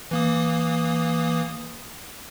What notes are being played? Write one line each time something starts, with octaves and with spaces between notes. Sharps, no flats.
E3 A#3 D#6